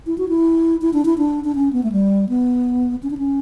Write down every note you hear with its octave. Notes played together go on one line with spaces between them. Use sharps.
E4
F#4
E4
E4
D4
E4
D4
D4
C#4
B3
A3
G3
B3
C#4
D4
C#4